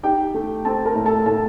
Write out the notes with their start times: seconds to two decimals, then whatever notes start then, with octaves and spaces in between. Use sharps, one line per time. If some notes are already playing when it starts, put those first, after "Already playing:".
0.03 D#4 G4 G5
0.34 A3
0.65 C4 A4 A5
0.85 A#4 A#5
0.95 A2
1.06 A4 A5
1.26 A2 A4 A5